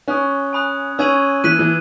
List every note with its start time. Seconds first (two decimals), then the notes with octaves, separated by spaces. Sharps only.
0.08 C#4 G#5 D#6 F#6
0.53 G#5 B5 D#6 F#6
0.98 C#4 E6 G#6 D#7 F#7
1.44 E3 F#6 B6 D#7 F#7
1.59 E3